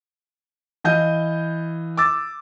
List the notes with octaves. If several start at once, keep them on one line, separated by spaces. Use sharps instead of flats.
E3 D#5 F5 G6 D#7
D6 E6 A6